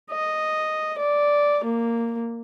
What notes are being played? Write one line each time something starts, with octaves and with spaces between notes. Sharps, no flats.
D#5
D5
A#3